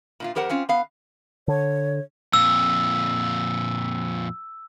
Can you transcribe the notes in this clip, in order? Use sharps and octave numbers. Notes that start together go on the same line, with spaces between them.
A#2 E4 F4
F2 G4 A#4 C5 F#5
C4 C#4 F4
B3 F5
D3 C#5
F2 A#2 E6